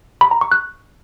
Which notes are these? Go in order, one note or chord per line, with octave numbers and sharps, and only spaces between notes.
B5
A#5
C#6
F#6